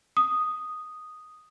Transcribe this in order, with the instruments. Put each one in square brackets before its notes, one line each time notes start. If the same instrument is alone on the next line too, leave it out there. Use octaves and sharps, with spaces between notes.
[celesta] D#6